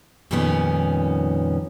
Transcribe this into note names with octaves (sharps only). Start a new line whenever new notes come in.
F2 A#2 D#3 G3 B3 C#4